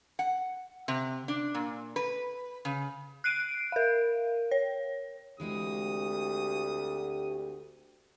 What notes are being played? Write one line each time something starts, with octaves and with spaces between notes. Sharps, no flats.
F#5
C3
D4
A#2
B4
C#3
F#6 C7 D7 D#7
A#4 F5
C#5
D2 E3 G#3 C4 G4 D#6